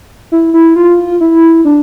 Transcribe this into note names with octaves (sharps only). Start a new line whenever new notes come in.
E4
E4
F4
E4
D4